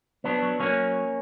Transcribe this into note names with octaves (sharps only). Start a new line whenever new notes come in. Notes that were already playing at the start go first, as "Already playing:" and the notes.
F#3 B3 D4
F#3
F#3 A#3 C#4